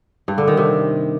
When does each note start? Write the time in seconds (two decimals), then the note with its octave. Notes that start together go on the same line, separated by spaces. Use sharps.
0.28 G2
0.38 D3
0.48 D#3
0.57 C3